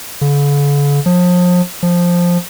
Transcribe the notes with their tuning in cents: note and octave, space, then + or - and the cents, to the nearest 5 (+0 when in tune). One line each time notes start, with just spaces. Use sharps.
D3 -45
F3 +35
F3 +5